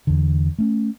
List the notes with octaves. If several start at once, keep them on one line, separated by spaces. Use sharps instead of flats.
E2 D3
A3 C#4